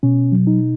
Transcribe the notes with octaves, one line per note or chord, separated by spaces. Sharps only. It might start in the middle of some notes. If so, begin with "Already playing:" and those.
B2 C#4
F#3
D#4